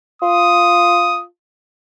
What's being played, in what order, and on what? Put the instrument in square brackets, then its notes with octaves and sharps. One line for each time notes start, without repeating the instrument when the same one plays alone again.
[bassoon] F4 [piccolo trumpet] D#6